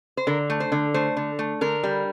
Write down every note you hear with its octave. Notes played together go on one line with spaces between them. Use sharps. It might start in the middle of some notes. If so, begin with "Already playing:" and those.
C5
D3 A#4
A3
C5
D3
A3 C5
D3
A3
D3 A#4
G3